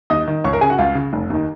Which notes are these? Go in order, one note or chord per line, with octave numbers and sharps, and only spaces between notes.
D#2 D#5 D#6
D#3
C#2 C#5 C#6
A#4 A#5
C#3 G#4 G#5
F#4 F#5
C#2 F4 F5
C#3
F1
D#2 D#3